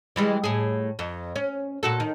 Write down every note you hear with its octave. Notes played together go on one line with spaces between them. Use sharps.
E3 G3 G#3
A2 G#4
F2
C#4
A#2 F#4 A4
D#3